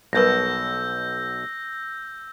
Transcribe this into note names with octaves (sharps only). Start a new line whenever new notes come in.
B1 B2 G3 A#4 B4 E6 G6 A#6